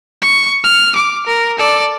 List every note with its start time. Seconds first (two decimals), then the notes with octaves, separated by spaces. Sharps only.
0.22 C#6
0.64 F6
0.96 D6
1.26 A#4
1.58 A4 D5